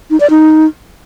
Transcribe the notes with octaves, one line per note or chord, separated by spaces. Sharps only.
D#4
D5
D#4